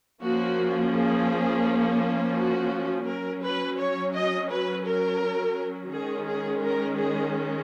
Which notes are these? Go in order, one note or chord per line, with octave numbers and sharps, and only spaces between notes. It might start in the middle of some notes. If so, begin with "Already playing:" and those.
F3 A#3 C#4 F#4
G#4
F#4
F#3 C#4 A#4
B4
C#5
D#5
B4
A#4
D#3 G#3 C#4 G#4
G#4
A#4
G#4